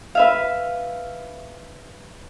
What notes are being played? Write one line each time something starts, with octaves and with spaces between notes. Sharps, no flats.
B4 E5 F5